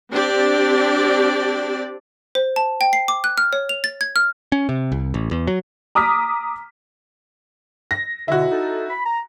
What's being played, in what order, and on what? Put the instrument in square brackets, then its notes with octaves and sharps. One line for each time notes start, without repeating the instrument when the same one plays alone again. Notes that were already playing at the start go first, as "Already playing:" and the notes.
[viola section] C4 D4 G4 D5
[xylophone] C5
A5
G5
C7
D6
F#6
F6
C#5
F7
A6
G#6
F6
[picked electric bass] C#4
C3
C2
A1
E2
F#3
[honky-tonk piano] A#5 D6 D#6 F6 B6
[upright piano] A#6
[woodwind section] F2 B2 D3 [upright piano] E4 F#4
[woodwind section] D#4 A4
B5
A#5